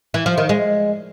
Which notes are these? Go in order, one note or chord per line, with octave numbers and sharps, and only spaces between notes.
E3
F3
D#3
G#3